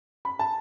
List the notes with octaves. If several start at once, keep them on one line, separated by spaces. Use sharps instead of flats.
B5
A5